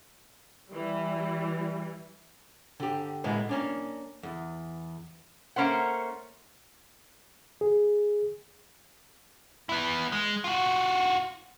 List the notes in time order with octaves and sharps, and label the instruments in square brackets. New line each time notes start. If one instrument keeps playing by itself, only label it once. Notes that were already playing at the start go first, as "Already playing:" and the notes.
[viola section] E3 G3
[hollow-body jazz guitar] D3 G4
A2 G#3 A#3 B3
A#3 C#4 D4
E2
[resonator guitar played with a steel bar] A3 A#3 C#4 C5 F#5
[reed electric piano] G#4
[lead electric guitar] B3 E4
G#3
F4 F#4